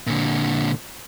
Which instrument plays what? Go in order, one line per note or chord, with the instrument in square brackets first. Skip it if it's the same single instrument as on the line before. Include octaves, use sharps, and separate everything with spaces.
[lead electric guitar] A#2 D3